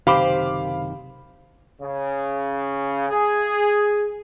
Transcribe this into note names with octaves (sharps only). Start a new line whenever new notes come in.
F#1 C3 D#3 G4 C5 F5 B5 D6
C#3
G#4